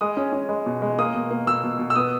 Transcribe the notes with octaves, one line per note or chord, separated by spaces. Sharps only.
G#3 D#6
C#4
C#4
G#3
B2
G#3
A#3 D#6
B2
A#3
B2 E6
B2
B2
E6
B3 D#6